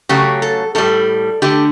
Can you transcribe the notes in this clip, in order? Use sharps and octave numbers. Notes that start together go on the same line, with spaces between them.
C#3 F#3 A3 G4
A4
A2 G3 A4
D3 A3 G4